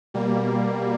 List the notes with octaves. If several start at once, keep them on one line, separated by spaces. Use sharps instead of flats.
B2 G3 A#3